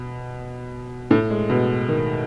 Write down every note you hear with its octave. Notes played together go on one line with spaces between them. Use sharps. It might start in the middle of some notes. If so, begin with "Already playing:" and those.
Already playing: B2
A2
G#3
B2
D#3